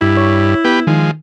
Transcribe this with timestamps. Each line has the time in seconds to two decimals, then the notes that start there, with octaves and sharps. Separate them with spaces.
0.01 G2 E4
0.17 C#5
0.65 B3 G4 B4
0.87 D#3 F3 G#3